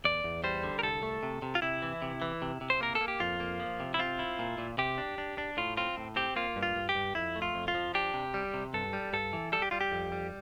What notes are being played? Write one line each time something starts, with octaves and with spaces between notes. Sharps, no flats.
E2 D5
E2
G3 C5
D3
A#4
C2 A4
A3
C3
C3
F4
C3 E4
E3
C3
E3
C3
C3
C5
A#3 A#4
A4
A#3
G4
F2 F4
A#3
F3
C3
E4
C4 F4
E4
A#2
A#2
C3 G4
D4
D4
D4
A2 F4
C4 F4
A2
C4 G4
A#3 F4
G2
F4
G2
G4
G2
F2 E4
A3
F4
F2
F4
F3
D4 G4
C3
G3
C3
G2 A4
G3
G2 A4
E3
G3 A4
G4
G3 F4
G4
F2
G3